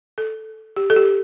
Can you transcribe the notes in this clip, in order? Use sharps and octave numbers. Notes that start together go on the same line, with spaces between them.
A4
G4
A4
G4